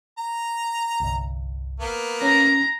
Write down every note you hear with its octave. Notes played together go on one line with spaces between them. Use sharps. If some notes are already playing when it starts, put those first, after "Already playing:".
A#5
G1 C2
A#3 B3
C#4 A#5